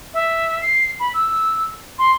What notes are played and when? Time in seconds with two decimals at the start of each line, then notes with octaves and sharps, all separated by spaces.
0.14 E5
0.62 C7
1.00 B5
1.14 E6
1.99 C6